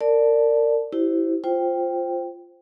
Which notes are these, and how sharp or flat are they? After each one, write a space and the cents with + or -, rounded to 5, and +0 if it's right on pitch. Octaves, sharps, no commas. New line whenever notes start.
A#4 -30 D5 +0 A5 +0
E4 +0 G4 -30 C5 +0
F4 +0 C5 +0 G5 +0